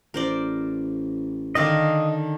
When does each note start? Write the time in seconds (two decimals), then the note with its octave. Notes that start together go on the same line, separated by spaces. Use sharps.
0.14 A1 A#4 C5 D5
1.55 D3 D#3 D5 D#5 F5